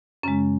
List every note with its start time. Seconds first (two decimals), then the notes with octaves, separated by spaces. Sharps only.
0.23 F#2 C#3 G#3 C#4